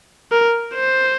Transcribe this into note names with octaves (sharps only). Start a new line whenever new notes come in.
A#4
C5